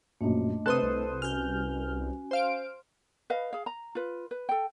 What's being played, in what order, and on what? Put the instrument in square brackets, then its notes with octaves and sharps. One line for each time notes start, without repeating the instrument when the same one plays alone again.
[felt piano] A#1 F#2 [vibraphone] A3 D4 D#5
[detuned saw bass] C3 [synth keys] A4 C5 D#6 [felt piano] B4 F#6
[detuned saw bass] C2
[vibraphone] C#4 F#4 G#5 [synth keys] F6 G6
[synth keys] C5 F5 D7
[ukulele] B4 D#5 F5
G#4 F5
A#5
F4 B4
B4
A4 G5